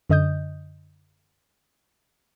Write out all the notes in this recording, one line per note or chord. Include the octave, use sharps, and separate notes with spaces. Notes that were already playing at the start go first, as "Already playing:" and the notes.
F#2 D3 D#5 D#6 G6